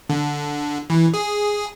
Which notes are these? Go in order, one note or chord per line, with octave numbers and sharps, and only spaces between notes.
D3
E3
G#4